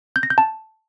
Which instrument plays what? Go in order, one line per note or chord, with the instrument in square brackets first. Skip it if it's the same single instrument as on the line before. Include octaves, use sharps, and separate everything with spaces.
[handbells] G6
A#6
G6
A5